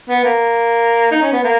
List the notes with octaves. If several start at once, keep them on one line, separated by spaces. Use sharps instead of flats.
B3
A#3
D#4
C#4
B3
A#3